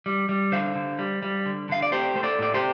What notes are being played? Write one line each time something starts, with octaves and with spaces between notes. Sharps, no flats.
G3
G3
D3 C5 F5
D3
G3
G3
D3
D3 F5
D5
A3 G4 C5
A3 C5
A4 D5
A2 D5
G4 C5